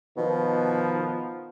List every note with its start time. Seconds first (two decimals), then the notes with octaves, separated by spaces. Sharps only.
0.17 B2 D#3 F3 B3